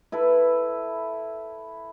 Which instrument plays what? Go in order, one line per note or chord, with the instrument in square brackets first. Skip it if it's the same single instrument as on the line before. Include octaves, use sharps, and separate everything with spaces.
[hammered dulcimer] E4 A4 B4